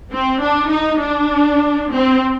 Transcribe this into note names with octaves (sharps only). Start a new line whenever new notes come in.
C4
D4
D#4
D4
C4